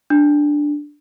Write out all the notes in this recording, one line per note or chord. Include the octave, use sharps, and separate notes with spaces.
D4